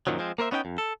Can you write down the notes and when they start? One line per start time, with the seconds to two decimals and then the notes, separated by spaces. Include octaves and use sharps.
0.07 F#2 A#2 D#3 F3 F#3
0.19 F3 G#3 C4
0.38 A#3 A#4 C5 E5
0.51 B3 C#4 D#4 D#5 G5
0.65 F2
0.78 A4